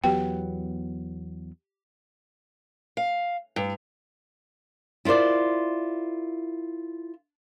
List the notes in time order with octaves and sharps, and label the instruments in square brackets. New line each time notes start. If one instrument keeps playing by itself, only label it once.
[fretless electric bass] E2 F#3 B3 [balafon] G4 G5
[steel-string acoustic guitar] F5
G2
[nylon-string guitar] E4 F4 A#4 C5 D5